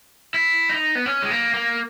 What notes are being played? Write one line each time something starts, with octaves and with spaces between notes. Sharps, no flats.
E4
D#4
B3
C#4
G#3
A#3
A#3